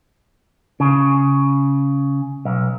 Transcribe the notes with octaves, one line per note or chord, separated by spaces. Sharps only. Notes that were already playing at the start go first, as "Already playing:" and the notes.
C#3
B1